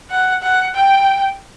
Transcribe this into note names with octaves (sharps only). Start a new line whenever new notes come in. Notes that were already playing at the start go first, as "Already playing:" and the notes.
F#5
F#5
G5